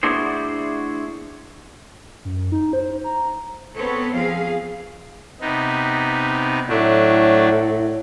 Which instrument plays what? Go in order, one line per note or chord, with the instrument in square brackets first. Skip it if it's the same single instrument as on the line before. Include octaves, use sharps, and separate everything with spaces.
[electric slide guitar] A3 D4 E4 F#4 G#4 C5
[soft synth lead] F#2
D#4
C5
A#5
[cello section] B3 C4 A4 C#5
F3 G#4 F5
[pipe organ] C3 B3 D#4
[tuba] A2 [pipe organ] F#3 A3 D4